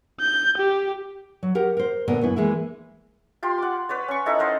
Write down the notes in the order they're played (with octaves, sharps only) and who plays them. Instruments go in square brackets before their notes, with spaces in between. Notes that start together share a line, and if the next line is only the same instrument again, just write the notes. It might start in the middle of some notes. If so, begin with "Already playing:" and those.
[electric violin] G6
G4
[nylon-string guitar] F#3
G4 A#4 F#5
A#4 C5
A#2 D3 B3 A#4
F#2 B3 E4
E3 G#3 A#3 E4
[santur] F4 G4 C6
F#5 D6
B4 C#5 D5
C#4 C#6
D#4 E4 A4
C5 D#5 F5 F#5